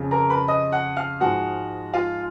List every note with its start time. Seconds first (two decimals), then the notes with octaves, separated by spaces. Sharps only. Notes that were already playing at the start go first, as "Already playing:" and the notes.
Already playing: F2 C#3 F3
0.11 A#4 A#5
0.29 B4 B5
0.48 D#5 D#6
0.72 F#5 F#6
0.97 F5 F6
1.20 G#2 F3 G#3 F#4 F#5
1.94 F4 F5